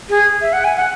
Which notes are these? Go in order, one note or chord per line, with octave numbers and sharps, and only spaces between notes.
G#4
E5
F#5
G#5
F#5